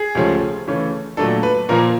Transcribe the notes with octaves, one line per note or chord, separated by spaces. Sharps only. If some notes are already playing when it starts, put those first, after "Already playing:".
Already playing: G#4
C#2 C3 F3 A3 C#4
C#3 E3 A3 C#4
A#2 F#3 A3 D4 A4
B4
A#2 F3 A#3 A#4